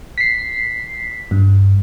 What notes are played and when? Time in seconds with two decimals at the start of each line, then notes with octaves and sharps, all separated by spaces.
0.18 B6 C7
1.31 G2